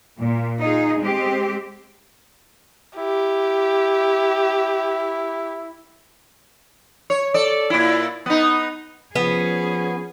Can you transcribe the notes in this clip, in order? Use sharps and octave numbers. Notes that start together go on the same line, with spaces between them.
A#2
D#4 F4 G#4
G#3 C4 G4
E4 G4
C#5
A4 D5
A#2 E4
B3 D#4
F3 B3 C#4 G#4